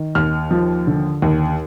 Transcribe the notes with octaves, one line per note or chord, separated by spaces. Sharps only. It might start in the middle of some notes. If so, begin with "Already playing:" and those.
Already playing: D#3
D#2 F6
F3
D3
D#2